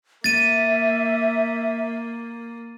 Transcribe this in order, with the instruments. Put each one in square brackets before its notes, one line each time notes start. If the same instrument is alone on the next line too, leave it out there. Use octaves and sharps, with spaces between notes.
[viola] A#3 [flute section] E5 [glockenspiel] A6 D#7